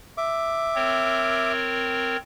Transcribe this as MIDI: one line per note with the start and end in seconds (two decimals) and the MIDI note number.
0.18 1.52 76
0.18 1.52 86
0.75 2.17 60
0.75 2.17 70
0.75 2.17 73